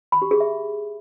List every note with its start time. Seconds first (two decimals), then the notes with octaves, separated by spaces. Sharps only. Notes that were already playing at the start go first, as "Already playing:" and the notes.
0.12 B5
0.22 G4
0.31 G#4
0.40 E5